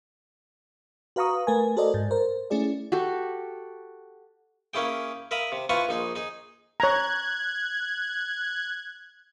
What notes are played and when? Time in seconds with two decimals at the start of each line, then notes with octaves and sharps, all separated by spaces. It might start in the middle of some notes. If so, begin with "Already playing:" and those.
1.16 F#4 B4 F5 A#5 C#6 D#6
1.47 A3 A#4 B4 G#5
1.77 F#4 A4 A#4 C5 D5 D#5
1.94 G#2
2.11 A#4 C5
2.50 A3 C#4 E4 G#4 D5
2.92 F#4 G4 A4
4.74 A#3 C#4 E4 G#4 G5
5.31 A#4 E5 F5 B5 D#6
5.52 C3
5.70 E4 F4 B4 F5 G#5 C#6
5.89 A#1 D#4 G#4
6.15 D#4 G#4
6.80 C#5 A#5 F#6 G#6